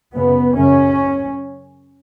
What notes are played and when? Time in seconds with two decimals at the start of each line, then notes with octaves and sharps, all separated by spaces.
0.14 F#2 C#3 B3
0.55 F#2 C#3 C#4